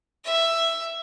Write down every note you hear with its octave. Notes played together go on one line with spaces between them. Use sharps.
E5